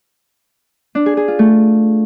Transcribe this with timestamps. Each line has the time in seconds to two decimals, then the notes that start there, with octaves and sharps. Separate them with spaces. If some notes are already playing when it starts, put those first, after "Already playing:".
0.95 D4
1.06 G#4
1.17 G#4
1.28 F4
1.39 A3